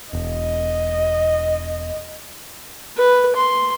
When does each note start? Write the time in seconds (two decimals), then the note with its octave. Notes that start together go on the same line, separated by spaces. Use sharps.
0.13 E1 D#5
2.97 B4
3.36 C6